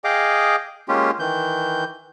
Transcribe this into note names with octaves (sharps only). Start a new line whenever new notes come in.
G#4 D#5 F5 G5 D6
G#3 A#3 C#4 F4 G4
D#3 E3 G6